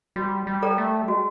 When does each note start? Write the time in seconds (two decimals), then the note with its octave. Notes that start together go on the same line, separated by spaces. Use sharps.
0.16 G3 F#4
0.47 G3
0.62 A4 D5 G5 A#5
0.78 A3
1.02 G3
1.08 G#3 F#4